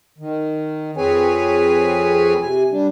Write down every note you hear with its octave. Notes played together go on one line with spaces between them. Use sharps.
D#3
F2 C4 G#4 B4 C#5 G#5
C3 G#5
G3 D4